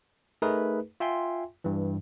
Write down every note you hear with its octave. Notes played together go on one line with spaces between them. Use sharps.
A3 D#4 G#4 A#4 B4
F4 E5 G5 G#5 C6
G2 E3